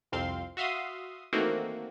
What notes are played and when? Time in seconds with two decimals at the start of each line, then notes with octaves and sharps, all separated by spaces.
0.12 C2 F2 C4 F5 C6
0.57 F#4 E5 F5 C6 D#6
1.33 D#3 E3 A3 A#3 C4 F#4